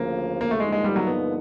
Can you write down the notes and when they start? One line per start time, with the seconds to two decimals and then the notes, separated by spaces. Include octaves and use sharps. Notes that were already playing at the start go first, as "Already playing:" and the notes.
Already playing: D2 C#3 F3 A#3
0.41 A#3
0.51 A3
0.60 G2 D3 F3 G#3 A#3 D#4
0.72 G#3
0.84 G3
0.96 F#3
1.07 B3